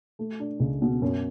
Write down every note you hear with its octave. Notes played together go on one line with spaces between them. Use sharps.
A3
D4
C#2
B2
F#2